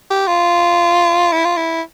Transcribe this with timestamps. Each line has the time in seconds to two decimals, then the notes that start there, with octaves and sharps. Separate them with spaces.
0.10 G4
0.27 F4
1.32 E4
1.45 F4
1.57 E4